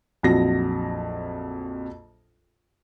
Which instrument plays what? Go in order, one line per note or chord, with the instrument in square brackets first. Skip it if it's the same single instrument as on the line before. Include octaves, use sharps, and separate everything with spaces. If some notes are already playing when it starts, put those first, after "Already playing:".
[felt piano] A#1 F2 F#3 A#6